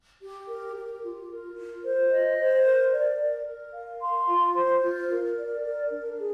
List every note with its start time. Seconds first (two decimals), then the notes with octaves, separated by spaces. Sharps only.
0.21 G4
0.48 A#4
0.76 G4
1.03 F4
1.30 A#4
1.57 F4
1.84 C5
2.11 D#5
2.38 C5
2.65 A#4
2.92 D5
3.19 A#4
3.47 A#4
3.73 F5
4.00 C6
4.28 F4
4.55 C5
4.82 F4
5.09 A#4
5.36 D5
5.63 A#4
5.90 D4
6.17 G#4